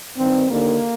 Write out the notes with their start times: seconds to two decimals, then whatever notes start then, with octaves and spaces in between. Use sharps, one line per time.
0.17 G2 D#3 C4
0.50 D#2 D3 A#3